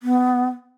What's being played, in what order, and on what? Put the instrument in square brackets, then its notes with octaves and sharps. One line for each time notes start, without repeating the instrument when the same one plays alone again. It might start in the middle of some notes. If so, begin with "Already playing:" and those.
[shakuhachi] B3